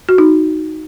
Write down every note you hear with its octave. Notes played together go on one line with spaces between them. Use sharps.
F#4
D#4